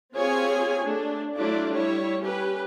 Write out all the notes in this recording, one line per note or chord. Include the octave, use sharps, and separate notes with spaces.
C4 F4 G4 G#4 C#5 G#5
A3 D4
F#3 A3 D4 E4 F4 D5
G3 E4 C#5
C#4 G4 B4